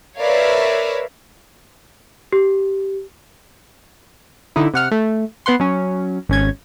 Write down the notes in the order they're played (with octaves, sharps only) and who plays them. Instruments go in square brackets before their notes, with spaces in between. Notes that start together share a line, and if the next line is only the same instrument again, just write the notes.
[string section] A#4 B4 C#5 D5 E5 F5
[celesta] G4
[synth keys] D3 D#4 E4
C3 F#5 F6
A3
B3 B4 F#5 C6
F#3 C#4
G#1 C#4 G#6